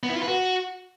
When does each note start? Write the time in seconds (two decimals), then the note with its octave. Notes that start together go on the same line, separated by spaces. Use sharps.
0.03 B3
0.09 E4
0.15 F4
0.22 B4
0.28 F#4